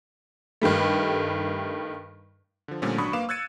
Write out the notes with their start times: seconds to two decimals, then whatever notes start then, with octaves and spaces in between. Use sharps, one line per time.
0.62 G2 D#3 G3 A3
2.68 D3 F3
2.82 A#2 D3 F3 G3 A3 C#4
2.98 G#1 F#3 D4 B5 C#6 D#6
3.13 A#3 B4 F5 D6 E7
3.29 E6 F#6 G#6 A6 C#7 D#7